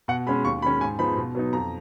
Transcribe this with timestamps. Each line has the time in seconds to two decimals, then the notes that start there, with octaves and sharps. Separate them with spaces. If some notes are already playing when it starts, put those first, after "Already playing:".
0.08 B2 F#5
0.27 G#3 C#4 B5
0.44 D#2 C#6
0.62 D#3 G#3 C#4 B5
0.81 G#2 G#5
0.99 F3 G#3 B3 D#4 B5
1.17 B2
1.35 F#3 B3 D#4
1.53 F2 A#5